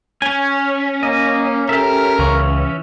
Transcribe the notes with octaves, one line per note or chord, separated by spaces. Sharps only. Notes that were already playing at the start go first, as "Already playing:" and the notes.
C#4 C#5 G#5
A#3 D#5
G4 A4 A#4 E5
C#2 E3 C#6